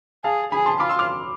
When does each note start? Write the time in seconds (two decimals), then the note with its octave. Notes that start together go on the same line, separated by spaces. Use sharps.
0.24 G#4 F5 A5
0.52 G#4 G#5 B5
0.66 A5 C6
0.80 F4 B5 D6
0.89 C6 E6
0.99 D6 F6